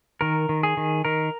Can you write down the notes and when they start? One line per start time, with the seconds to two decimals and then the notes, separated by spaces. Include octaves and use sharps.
0.21 D#3 A#4
0.49 D#3
0.63 G#4
0.77 D#3
1.05 D#3 A#4